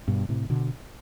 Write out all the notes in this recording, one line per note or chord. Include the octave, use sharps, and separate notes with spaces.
G2 B2
A2 C3
B2 D3